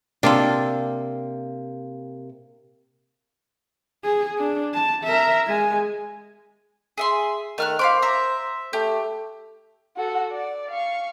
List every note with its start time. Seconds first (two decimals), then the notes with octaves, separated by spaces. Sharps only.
0.23 C3 A#3 D4 F4 A4
4.04 G#4
4.38 D4
4.74 A5
5.04 A#4 E5
5.47 G#3 G#5
6.98 G#4 E5 C6
7.58 D#3 A3 F6 F#6
7.79 C5 F5 B5 D6
8.02 E5 A#5
8.73 A3 G4
9.97 F#4 A4
10.32 D5
10.71 F5 C#6